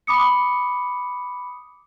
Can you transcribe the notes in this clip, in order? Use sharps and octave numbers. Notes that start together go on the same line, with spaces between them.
B5 D6 D#6 C#7